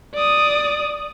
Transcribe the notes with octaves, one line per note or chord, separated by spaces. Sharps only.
D5 D#6